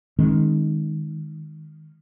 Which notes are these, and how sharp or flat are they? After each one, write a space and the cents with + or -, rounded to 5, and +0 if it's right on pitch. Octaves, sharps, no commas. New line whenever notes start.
D#3 +0 G#3 +0 C#4 -45